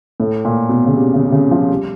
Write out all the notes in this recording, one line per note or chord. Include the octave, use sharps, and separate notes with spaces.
A2
A#2
B2
C#3
C3
C#3
C3
C#3
F3
G3